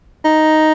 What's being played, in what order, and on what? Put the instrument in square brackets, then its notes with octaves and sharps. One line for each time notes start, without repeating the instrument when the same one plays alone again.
[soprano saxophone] D#4